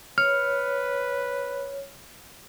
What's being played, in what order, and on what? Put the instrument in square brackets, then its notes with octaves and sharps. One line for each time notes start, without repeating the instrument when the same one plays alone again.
[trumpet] B4 [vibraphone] C#5 [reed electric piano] F6